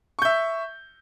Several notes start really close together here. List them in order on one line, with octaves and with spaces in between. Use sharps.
C#6 G6 E5